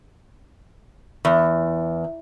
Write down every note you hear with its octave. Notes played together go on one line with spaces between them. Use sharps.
E2